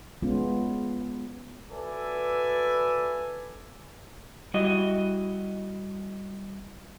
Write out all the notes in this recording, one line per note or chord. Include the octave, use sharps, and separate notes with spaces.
G#3 B3 C#4 F4
F#4 A4 B4 D5 E5 G#5
G3 E4 F#4 D#5